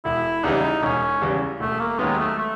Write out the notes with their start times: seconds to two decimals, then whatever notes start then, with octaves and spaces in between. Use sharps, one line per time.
0.05 E1 E4
0.44 E2 C#3 E3 G3 D#4
0.83 E1 C#4
1.22 E2 C#3 E3 G3
1.60 E1 A3
1.80 A#3
1.99 D#2 D#3 F#3 G#3 B3
2.19 A3
2.38 A3